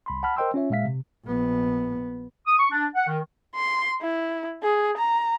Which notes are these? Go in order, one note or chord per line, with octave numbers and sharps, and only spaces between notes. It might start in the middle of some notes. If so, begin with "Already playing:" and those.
C2 B5 C6
F#5 A5 B5 F6
A#4 C5 D#5 G5 C6 E6
C#4 F4 C#5 E5
A#2 G#3 E5 F5 B6
C3
A#1 B3
D#6
C#6
D4
F#5
D#3
C6
E4
G#4
A#5